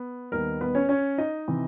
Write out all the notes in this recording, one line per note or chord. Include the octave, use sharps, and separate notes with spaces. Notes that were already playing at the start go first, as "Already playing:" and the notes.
Already playing: B3
D#2 D#3 G3 B3 A#4
B3 B4
C#4 C#5
C#4 C#5
D#4 D#5
C3 E3